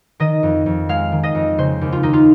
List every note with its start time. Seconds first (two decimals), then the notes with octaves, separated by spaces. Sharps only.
0.20 D#3 D#5
0.43 F2
0.66 F2
0.89 G#3 F5
1.12 D#3
1.23 D#5
1.35 F2
1.58 C#3 C5
1.81 D#2
1.93 F4
2.03 D#2 D#4
2.13 F4